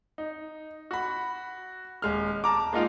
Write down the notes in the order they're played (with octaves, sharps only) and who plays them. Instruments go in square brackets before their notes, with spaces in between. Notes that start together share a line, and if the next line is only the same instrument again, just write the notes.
[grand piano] D#4
F#4 B5
D#1 G#3 F6
A5 A#5 D6
G#3 A#3 D#4 F4 F5